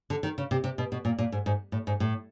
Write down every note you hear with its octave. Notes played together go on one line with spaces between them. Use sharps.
D3
D#3
C#3
C3
C3
B2
B2
A#2
A#2
G#2
G#2
A2
G#2
A2